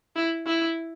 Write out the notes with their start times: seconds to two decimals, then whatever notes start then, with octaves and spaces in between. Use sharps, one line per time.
0.16 E4
0.46 E4